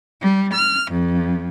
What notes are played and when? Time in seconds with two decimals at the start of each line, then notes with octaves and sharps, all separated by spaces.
0.22 G3
0.54 F6
0.92 F2